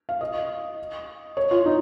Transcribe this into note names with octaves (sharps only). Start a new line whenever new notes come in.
F5
D#5
C#5
F4
D#4